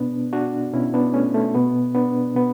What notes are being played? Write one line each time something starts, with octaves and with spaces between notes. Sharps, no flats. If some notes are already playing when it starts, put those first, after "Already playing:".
Already playing: B2 B3 D4
D4 F#4
B2 C#4 E4
B3 D4
A3 C#4
A3
B2 B3
B3 D4
B2 B3